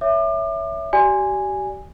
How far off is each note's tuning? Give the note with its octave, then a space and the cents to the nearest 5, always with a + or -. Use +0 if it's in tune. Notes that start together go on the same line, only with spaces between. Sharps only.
C#5 +15 E5 +0 D6 +35
G4 -40 D5 -10 G#5 -10